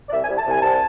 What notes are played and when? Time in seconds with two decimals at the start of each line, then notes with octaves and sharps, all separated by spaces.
0.08 D5
0.12 C2 E5
0.24 G#5
0.29 C2
0.38 A5
0.46 C2 G#5
0.62 C2 A5